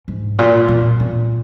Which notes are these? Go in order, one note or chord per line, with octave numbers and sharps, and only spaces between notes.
G#2
A#2
A#2
A#2